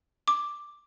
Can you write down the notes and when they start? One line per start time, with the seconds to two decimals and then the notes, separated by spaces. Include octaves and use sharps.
0.28 D6